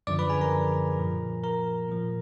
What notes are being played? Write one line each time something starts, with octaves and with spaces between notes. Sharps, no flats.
F#2 D3 F3 D5 D6
B4 B5
G#4 G#5
A#4 A#5
A#2 F3
A#4 A#5
A#2 F3